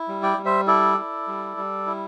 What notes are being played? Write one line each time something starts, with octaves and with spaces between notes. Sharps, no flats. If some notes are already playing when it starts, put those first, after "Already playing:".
Already playing: E4
G3
D5 G5
G3
C5 E5
E4 A4 D5
E4
G3
G3
E4